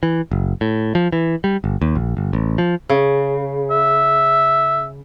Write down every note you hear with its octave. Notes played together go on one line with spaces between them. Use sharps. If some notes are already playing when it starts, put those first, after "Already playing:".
E3
F#1
A2
F3
E3
G3
G1
D#2
A#1
G1
A1
F3
C#3
E5